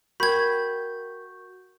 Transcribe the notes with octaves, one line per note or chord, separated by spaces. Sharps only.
F#4 A#4 G5 B5 G6 G#6